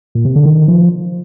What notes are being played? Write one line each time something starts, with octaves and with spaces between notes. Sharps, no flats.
A#2
C3
D3
D#3
F3